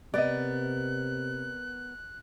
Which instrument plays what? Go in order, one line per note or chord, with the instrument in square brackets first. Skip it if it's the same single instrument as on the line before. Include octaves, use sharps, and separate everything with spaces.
[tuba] C3 [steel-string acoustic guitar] B3 A#4 [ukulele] D5 D#5 [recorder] F#6